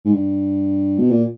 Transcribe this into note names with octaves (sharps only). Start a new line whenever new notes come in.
G#2
G2
B2
A#2